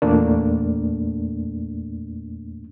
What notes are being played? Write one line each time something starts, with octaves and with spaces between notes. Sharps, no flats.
E2 A#2 A3 A#3 D4